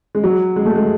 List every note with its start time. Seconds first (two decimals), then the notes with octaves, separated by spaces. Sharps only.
0.15 G#3
0.24 F#3
0.56 G#3
0.65 A3
0.75 G#3